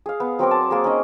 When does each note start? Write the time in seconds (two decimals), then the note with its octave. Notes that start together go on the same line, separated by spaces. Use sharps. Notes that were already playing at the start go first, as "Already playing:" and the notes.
0.06 G#4 F5
0.20 B3
0.39 F#3 C4 A#4 D6
0.51 A5 C6
0.70 A#3 G#4 A#4
0.84 C#4 D#4 D#5